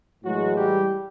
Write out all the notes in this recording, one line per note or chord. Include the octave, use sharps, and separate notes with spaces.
A2 E3 F#3 G#3 F#4
G3 G4